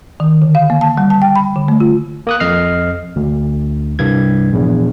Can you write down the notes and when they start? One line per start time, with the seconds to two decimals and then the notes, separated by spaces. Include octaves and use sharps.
0.20 D#3
0.42 D3
0.55 F5
0.70 A#3
0.81 A5
0.97 G3
1.10 A5
1.22 G5
1.36 B5
1.56 D3
1.68 A3
1.80 F4
2.27 A#3 D#6 F#6
2.40 F2 D#5 F6 C7
3.16 D2
3.99 C2 G2 G#6
4.52 A#1 E2